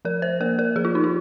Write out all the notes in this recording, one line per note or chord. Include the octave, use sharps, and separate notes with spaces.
F3 A#4
C5
A#3 A#4
A#4
F3 G#4
F4
D#4
F4